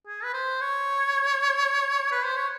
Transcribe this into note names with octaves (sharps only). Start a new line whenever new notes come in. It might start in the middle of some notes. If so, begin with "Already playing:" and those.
G#4
B4
C5
C#5
B4
C5
C#5